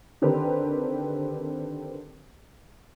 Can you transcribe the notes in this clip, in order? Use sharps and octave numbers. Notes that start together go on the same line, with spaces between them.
D3 D#3 C4 G4 A#4 B4